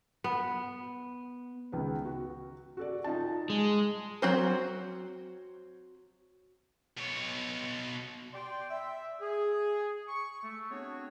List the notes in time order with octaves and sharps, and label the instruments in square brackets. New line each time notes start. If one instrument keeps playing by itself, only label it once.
[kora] B3
[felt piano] C#2 D#3 B3
F#4
F#4 A4 D5
D#4 F4 A5
[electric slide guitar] G#3
[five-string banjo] F#3 C4 C5
[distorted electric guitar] B2 C#5
[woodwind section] D5 G5 C6
E5
G#4
C#6
A3
B3 C4 D4 F#4 G#4 C#5